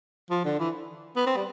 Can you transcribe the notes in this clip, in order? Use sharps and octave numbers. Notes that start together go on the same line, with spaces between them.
F3
D3
E3
B3
C4
G3